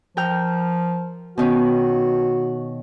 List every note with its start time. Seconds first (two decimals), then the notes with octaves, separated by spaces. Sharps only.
0.17 F3 A#4 G5 F6
1.38 B2 D#3 C#4 F#4